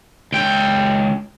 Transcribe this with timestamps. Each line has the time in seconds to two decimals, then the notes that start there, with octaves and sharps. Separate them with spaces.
0.32 C#2 G5